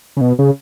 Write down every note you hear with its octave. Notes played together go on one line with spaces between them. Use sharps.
C#3
B2
C#3